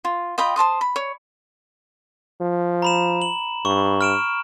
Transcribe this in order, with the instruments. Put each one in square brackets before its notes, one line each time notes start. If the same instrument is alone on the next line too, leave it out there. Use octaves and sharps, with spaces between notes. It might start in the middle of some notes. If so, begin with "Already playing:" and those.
[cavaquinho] F4
F4 D#5 G5 B5
C5 A5 C6 D#6
B5
C#5
[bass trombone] F3
[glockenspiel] A#5 B5 E7
F#7
[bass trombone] G2 [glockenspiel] C#6
[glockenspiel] F6 D7 E7